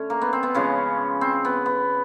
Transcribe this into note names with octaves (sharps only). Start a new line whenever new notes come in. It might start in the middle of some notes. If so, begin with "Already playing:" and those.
Already playing: D3 A3 C#4
A#3
B3
C4
B3
C#3 F3 G#3 C#4
C4
B3
B3